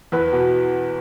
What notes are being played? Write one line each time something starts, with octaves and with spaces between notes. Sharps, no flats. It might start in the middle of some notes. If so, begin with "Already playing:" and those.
E2 B4
B2